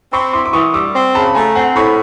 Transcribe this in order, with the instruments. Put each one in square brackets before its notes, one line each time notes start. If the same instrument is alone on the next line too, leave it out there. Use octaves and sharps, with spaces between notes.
[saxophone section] C4 [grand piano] B5 C#6
[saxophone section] E4 [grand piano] C6 D6
[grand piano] D6
[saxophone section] E3 [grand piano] C#6 D#6
[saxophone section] G3 [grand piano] D6 E6
[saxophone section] C4
[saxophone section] C#3 [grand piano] A5 B5
[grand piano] B5
[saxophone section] A3 [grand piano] G#5 A#5
[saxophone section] C4 [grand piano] F#5 G#5
[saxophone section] A2 [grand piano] B5 C#6